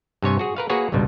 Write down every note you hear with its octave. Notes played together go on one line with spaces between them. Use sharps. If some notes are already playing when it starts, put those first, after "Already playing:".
G2 C3 C#5 G#5
F#4 G#4
A#4 B4 F5
A#3 F#4 G#4 B4 C#5
G#1 C#2 G2 B2 G3